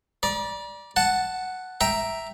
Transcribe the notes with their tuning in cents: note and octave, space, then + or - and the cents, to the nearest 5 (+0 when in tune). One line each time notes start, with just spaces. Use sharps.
D5 +0 A#5 +45
F#5 +0 A5 +0
E5 +0 G5 +0 A#5 +0